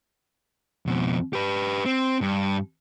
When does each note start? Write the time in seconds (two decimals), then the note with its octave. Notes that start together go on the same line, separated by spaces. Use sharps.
0.86 F2 B2
1.33 G4 B4
1.85 C4
2.21 G2